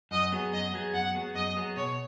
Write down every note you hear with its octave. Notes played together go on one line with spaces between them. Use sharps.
F#2 D#5
F#3 B3 G#4
F#2 D#5
F#3 B3 G#4
F#2 F#5
F#3 B3 G#4
F#2 D#5
F#3 B3 G#4
B2 C#5